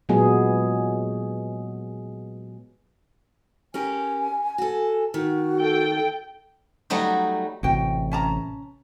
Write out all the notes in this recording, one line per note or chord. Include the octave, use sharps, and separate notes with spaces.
A#2 F#3 G#3 B3 G#4
C#4 G4 A#4 G#5
F#4 A4
D#3 F#4
A4 G5
F#3 G3 A3 D#4
A1 C3 F#4 G5
C#4 A5 A#5